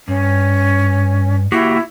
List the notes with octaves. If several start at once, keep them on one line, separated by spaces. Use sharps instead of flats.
G2 C#4
A#3 E4 F#4 G4